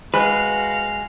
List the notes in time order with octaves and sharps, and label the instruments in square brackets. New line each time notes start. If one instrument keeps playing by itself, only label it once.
[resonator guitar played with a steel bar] G#3 [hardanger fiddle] F#4 F5 [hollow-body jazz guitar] B4